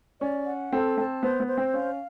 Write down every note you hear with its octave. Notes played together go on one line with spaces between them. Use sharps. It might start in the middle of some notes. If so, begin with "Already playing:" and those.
C#4 D5
F#5
C4 A4
C4 A5
B3 C5
B3
C5
C4
C#4 F5